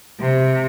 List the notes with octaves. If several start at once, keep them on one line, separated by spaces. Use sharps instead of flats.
C3